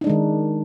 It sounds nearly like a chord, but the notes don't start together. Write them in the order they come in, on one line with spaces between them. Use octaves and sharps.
D#4 D4 G#3 D#3